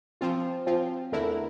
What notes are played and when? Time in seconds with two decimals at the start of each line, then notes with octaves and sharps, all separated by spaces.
0.21 F3 C4 F4
0.67 F3 C4 F4
1.12 E2 D3 A3 E4 A#4